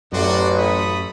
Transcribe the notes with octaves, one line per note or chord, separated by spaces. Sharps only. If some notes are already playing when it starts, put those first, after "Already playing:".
A1 F#2 F#4 D5 C6
A3 B5 D#6